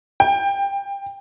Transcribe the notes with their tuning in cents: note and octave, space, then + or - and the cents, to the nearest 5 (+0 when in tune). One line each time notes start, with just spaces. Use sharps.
G5 +20